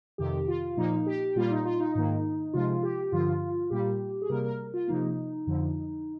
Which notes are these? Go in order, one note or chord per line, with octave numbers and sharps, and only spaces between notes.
F2 C3 D#3 G4
F4
A#2 F3 A#3 D#4
G4
A#2 G3 A#3 F4
D#4
F4
D#4
G#2 D#3 A#3
C3 F3 G#3 F4
G4
G2 D3 F3 F4
A#2 G3 A#3 G4
G#4
C3 G3 A#3 A#4
A#4
F4
C3 F3 A#3 D#4
F2 D3 F3